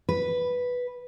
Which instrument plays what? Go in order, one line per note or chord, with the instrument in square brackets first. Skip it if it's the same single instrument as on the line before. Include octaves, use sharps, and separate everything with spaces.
[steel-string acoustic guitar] B4